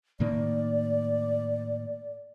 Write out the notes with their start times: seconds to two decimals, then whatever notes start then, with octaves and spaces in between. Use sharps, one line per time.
0.20 A2 D#3 A#3 D5